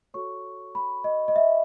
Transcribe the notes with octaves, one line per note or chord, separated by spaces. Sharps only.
F#4 A4 C#5 C#6
B5
D#5
D#5
E5